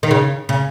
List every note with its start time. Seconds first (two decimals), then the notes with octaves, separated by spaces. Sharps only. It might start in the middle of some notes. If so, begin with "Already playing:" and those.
0.03 D#3
0.11 C#3
0.49 C#3